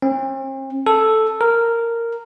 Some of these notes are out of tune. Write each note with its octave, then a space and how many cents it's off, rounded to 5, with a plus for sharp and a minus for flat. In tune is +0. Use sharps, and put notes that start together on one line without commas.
C4 +45
A4 +0
A#4 -10